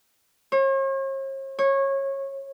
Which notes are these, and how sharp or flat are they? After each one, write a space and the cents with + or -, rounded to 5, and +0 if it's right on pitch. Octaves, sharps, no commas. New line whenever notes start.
C#5 -45
C#5 -20